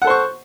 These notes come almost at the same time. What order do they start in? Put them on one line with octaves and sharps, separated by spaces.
F#5 A4 C5 C#6